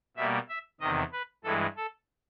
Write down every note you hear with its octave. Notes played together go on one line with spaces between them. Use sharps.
B2 G3 A#3 E5
E5
E2 C3 D#3 D#5
B4
G2 E3 G#3 A4
A4